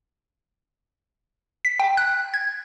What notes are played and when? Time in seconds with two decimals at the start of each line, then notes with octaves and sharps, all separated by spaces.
1.65 B6
1.80 G5
1.97 F#6
2.34 G#6